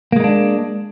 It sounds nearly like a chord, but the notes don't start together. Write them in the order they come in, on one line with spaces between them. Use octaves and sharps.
A#3 G#3 D#4 D4